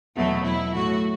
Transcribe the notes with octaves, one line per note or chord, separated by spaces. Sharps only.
E2 B2 F#3 A3
E4
A2 F#3 A3 F#4